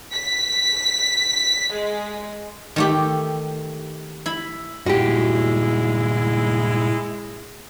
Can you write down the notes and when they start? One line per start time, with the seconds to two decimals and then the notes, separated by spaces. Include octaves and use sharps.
0.13 B6
1.73 G#3
2.76 D#3 A3 G4
4.26 E4 B5
4.86 G2 A#2 G#3 E4 F#4 G4